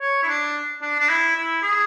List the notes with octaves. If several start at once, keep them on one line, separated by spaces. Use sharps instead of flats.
C#5
E4
D4
D4
D4
E4
E4
G#4